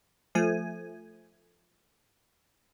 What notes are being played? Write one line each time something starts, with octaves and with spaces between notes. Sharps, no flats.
F3 A3 G#5